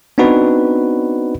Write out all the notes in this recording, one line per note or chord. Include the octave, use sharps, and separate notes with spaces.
B3 C4 D4 D#4 F#4 B4